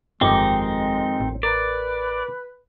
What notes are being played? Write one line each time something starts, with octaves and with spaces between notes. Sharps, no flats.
G1 F2 D#3 G#3 C4 D#4 G4
A1
A#4 B4 D5